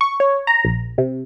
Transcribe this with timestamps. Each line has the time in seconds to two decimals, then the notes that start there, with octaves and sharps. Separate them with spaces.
0.01 C#6
0.20 C#5
0.47 A#5
0.65 A#1
0.98 C3